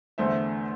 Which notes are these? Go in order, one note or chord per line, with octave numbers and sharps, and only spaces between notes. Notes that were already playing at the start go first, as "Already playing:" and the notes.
E2 D3 A3 C5 E5